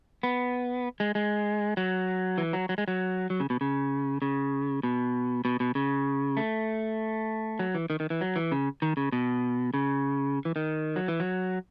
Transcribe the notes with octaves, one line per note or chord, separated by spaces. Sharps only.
B3
G#3
G#3
F#3
E3
F#3
F#3
G#3
F#3
F#3
C#3
B2
C#3
C#3
B2
B2
B2
C#3
A3
F#3
E3
D#3
D#3
E3
F#3
E3
C#3
D#3
C#3
B2
C#3
E3
D#3
F#3
E3
F#3